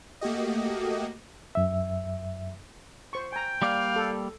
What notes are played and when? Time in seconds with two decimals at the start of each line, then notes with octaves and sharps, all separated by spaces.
0.21 A3 A#3 F#4 G4 D#5
1.55 F#2 E5
3.13 C5 C#6
3.33 G5 G#5 A#5
3.62 G3 A#3 D5 F5
3.96 A4